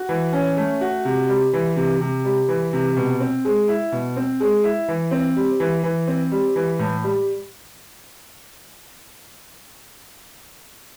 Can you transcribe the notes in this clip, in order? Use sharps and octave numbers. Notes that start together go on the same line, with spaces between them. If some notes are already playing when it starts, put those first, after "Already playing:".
Already playing: F#4
E3
C#4
A3
F#4
C3
G3
E3
C3
C3
G3
E3
C3
B2
C4
G#3
E4
B2
C4
G#3
E4
E3
C4
G3
E3
E3
C4
G3
E3
A2
G3